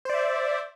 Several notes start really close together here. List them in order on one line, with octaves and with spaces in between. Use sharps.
C5 D5 E5